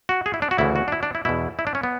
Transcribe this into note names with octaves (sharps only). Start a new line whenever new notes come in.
F#4
G#4
E4
D4
F#4
D2 C#3 E3 E4
F#4
D4
E4
D4
E4
E2 B2 E4
E4
D4
C#4
B3